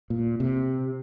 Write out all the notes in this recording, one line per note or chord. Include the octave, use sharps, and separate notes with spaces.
A#2
C3